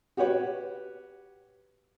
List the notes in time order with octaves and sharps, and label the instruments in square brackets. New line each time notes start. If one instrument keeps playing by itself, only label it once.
[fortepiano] F#4 G4 B4 C#5 F#5